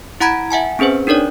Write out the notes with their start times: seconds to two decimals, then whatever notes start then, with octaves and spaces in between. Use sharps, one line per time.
0.20 E4 F#5 A#5 B5 G#6 D7
0.51 E5 F#5 G#5 A5
0.79 C4 C#4 G#4 B4 C5
1.07 D4 D#4 A#4 C#5 D5